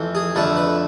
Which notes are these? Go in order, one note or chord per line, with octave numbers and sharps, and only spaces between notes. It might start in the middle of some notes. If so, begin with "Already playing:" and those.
Already playing: F2 E3 A3 C4
G#4
F2 D3 A3 B4
B4